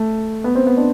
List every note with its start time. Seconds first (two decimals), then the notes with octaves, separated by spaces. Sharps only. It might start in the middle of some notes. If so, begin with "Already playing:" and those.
Already playing: A3
0.44 B3
0.55 C4
0.67 B3
0.77 D4